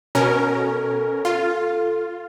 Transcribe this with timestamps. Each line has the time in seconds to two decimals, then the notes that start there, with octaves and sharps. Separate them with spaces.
0.15 B2 C#4 A#4
0.51 A4
1.25 F4